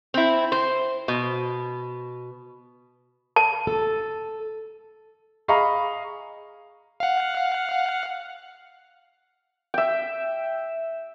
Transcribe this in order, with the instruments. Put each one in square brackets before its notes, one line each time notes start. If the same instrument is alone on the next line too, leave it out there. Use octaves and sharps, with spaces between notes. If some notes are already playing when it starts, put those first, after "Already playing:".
[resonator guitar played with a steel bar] C4 E4
C5
B2
[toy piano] A5
[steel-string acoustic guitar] A4
[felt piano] G#4 D#5 F5 A#5 B5 C#6
[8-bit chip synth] F5 F#5
[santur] E5 G5